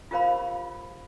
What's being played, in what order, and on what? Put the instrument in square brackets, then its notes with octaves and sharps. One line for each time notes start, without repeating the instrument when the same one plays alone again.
[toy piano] F4 G4 A#4 C5 F5 B5